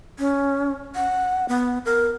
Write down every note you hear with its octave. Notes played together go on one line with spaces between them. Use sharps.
C#4
F#5
B3
A#4